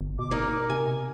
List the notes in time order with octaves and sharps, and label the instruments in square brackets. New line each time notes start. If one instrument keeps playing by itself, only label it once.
[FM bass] G1
[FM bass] B2 [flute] D6
[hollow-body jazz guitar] A#3 D#4 [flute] A#4
[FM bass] C3 [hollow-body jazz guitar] G#5